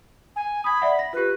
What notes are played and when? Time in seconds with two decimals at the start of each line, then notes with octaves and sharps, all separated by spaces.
0.35 G#5
0.64 B5 D#6 G#6
0.82 D5 E5 F#5
0.99 A#6
1.13 F4 G4 B4